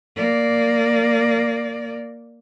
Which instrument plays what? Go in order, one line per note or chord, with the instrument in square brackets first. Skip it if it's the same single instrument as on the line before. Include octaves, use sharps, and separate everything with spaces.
[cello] A#3 D5